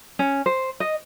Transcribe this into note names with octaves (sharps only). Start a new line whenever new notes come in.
C#4
C5
D#5